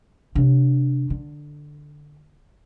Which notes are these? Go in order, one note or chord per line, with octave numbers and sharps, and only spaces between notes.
C3 D4
D3